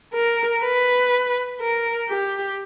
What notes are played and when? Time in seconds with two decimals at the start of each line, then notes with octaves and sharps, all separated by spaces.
0.13 A#4
0.62 B4
1.61 A#4
2.10 G4